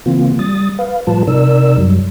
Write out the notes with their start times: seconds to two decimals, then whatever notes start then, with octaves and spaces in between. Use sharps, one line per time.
0.06 C#3 E3 A#3 C4 F4
0.39 G3 D#6 A6
0.79 B4 F5
1.07 A2 F3 G3 F4 B4 A5
1.27 C3 D#4 A#4 D5 E6
1.78 F#2 F#3 G3